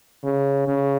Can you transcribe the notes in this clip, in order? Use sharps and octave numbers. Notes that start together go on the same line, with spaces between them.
C#3
C#3